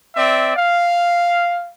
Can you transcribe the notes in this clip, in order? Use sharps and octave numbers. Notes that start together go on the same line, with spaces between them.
C4 D5 E5
F5